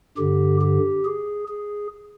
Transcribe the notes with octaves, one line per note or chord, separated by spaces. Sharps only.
G2 D3 G4
G4
G#4
G#4